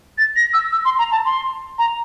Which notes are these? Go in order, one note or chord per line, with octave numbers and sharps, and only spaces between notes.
A6
A#6
E6
E6
C6
A#5
A5
C6
A#5